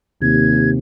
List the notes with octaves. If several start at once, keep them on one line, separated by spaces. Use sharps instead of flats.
D#2 C3 G#6